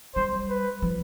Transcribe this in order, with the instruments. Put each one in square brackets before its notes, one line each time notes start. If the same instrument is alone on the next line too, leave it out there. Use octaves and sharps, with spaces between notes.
[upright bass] G3 [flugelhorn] C5
[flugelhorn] B4
[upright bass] F3